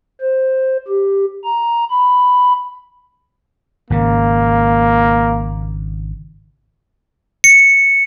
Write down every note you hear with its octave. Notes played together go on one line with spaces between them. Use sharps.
C5
G4
A#5
B5
G#1 C#3 A#3
C#7